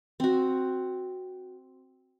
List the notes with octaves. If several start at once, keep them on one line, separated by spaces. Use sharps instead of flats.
C4 F#4